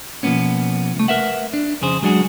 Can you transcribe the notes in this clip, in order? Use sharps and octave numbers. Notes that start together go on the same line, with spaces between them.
B2 F3 F#3 A#3 B3 C#4
C2 A3
A#4 B4 E5 F#5
D4
F2 C#3 G#4 C5
F#3 G#3 D4 F#4 G#4